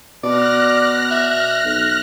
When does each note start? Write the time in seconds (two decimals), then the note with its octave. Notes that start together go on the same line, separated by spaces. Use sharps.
0.24 B2 D5 F6 F#6 A#6
1.11 E5
1.64 B1